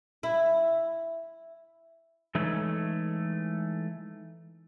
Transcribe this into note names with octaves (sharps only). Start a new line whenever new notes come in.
E4
E3 G#3 A3 D#4 A4 C#5